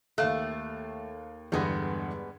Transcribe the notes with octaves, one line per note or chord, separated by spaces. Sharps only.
D#2 A3 F5 F#6
E2 G2 D3 G3 G#3 B3